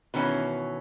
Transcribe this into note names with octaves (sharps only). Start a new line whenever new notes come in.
B2 D#3 E3 C#4